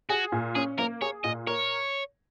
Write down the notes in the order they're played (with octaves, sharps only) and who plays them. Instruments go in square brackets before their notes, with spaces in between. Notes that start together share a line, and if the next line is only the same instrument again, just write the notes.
[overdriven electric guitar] F#4 [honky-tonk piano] G#4
[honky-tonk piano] A#2
[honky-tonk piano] C#4 [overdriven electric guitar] G#4
[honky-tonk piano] A#3 [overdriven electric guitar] A#4
[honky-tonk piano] G#4 [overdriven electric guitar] C#5
[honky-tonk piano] A#2 [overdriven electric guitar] D#5
[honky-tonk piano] A#4 [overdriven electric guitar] C#5